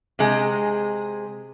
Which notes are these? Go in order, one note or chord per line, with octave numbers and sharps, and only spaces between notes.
C3 G#3